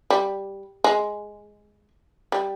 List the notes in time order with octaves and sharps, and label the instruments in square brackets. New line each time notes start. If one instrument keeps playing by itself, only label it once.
[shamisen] G3
G#3
G3